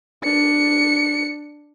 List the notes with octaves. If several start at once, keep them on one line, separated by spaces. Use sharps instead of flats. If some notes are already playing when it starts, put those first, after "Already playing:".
D4 C#7